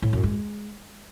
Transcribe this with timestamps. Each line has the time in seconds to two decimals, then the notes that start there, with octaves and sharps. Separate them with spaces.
0.02 A2
0.13 F#2
0.23 G#3